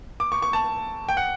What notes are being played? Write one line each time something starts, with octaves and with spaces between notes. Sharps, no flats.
D6
C#6
C#6
A5
G5
F#5